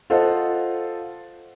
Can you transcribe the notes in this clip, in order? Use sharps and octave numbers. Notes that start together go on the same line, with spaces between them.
F4 A4 C5 D#5 F#5